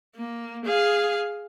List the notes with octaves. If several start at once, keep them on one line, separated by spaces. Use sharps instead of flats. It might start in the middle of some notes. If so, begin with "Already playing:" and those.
A#3
G#4 F5